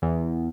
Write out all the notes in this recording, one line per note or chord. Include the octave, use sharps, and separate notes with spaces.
E2